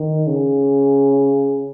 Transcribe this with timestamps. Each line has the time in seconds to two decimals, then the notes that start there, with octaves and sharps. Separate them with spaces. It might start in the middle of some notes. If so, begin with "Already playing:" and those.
Already playing: D#3
0.27 C#3